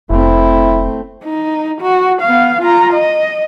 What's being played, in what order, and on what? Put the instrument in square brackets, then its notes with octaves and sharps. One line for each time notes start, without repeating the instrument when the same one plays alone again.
[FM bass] F1 [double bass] A3 C4 [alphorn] E4
[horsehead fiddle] D#4
F#4
B3 F5
F4 A#5
D#5